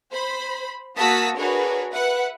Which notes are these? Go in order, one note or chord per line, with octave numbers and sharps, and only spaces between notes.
C5 B5
A#3 F#4 A5 D#6 E6 B6
D4 F#4 G#4 A#4 B4 C#5
B4 E5 F#5